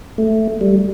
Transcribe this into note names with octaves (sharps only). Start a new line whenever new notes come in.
A3
G3